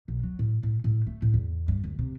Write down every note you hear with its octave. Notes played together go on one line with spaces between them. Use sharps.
B1
F#3
A2
A2
A2
A3
A2
E2
G2
D2
C3